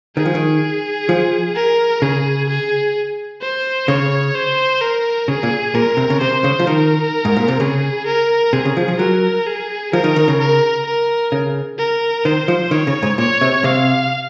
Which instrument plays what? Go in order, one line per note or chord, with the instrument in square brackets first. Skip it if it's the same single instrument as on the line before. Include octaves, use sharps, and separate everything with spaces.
[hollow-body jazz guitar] D#3 [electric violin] G#4
[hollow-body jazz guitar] F3
D#3
F3
[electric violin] A#4
[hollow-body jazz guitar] C#3 [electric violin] G#4
[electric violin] G#4
C5
[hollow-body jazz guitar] C#3 [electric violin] C#5
[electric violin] C5
A#4
[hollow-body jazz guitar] C#3 [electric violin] G#4
[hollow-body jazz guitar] A#2
[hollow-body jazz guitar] A#2 [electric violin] A#4
[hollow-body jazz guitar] C3
C#3
[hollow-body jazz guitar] C3 [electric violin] C5
[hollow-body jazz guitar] C#3
F3
[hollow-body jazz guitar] D#3 [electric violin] A#4
[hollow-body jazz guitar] G#2
A#2
C3
[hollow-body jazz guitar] C#3 [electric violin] G#4
[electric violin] A#4
[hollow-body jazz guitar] C3 [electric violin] G#4
[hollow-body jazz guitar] C#3
F3
F3
[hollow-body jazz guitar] F#3 [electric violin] A#4
[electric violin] G#4
[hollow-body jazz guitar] F3 [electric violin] A#4
[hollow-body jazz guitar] D#3
D#3
C#3
[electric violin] A#4
A#4
[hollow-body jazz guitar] C#3
[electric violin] A#4
[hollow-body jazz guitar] D#3 [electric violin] C5
[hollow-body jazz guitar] F3
[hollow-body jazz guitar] D#3 [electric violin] C#5
[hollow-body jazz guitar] C#3
G#2
[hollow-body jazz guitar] A#2 [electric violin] C#5
[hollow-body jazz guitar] C3
[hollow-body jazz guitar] C3 [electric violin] F5